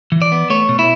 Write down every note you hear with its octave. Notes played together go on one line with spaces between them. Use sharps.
E3
D5
B3
A3 C#5
B2
E4